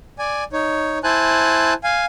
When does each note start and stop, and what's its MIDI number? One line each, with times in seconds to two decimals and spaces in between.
0.19 0.44 74
0.19 0.44 80
0.53 0.99 63
0.53 0.99 73
1.04 1.73 64
1.04 1.73 72
1.04 1.73 80
1.04 1.73 81
1.04 1.73 90
1.84 2.05 77
1.84 2.05 80